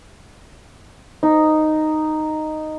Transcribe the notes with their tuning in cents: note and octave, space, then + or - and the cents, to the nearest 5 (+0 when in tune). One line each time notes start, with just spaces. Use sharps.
D#4 -5